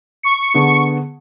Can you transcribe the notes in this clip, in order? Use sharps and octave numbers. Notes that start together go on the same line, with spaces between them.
C#6 C#7
D3 B3 G#4